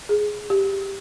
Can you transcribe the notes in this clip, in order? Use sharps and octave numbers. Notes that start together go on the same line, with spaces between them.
G#4
G4